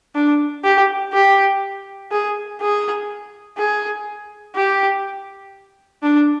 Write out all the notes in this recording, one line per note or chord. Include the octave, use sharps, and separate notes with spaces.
D4
G4
G4
G#4
G#4
G#4
G4
D4